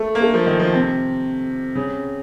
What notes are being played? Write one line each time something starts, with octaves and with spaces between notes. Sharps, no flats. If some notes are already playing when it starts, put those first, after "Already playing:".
Already playing: A3
A#3
A3
F3
D#3
F3
C3
C#3